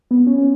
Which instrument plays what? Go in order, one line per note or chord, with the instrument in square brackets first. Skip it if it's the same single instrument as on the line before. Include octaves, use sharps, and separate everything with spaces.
[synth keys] B3
C#4
C#4